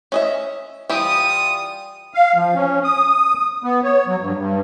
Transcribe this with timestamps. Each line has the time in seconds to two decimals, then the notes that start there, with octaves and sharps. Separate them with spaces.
0.12 C#4 D#5 E5
0.89 E3 G3 F4 G4 D#6
2.14 F5
2.35 F3
2.55 C#4
2.84 D#6
3.64 B3
3.83 C#5
4.07 F#3
4.20 G2
4.37 G2